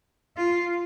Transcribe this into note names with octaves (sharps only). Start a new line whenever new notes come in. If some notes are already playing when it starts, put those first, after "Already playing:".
F4